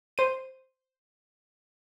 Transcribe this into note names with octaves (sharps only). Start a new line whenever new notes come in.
C5 D#7